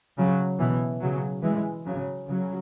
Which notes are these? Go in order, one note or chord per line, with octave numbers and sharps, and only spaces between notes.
C#3 F#3
B2 E3
C#3 F#3
E3 G#3
C#3 F#3
C#3 F#3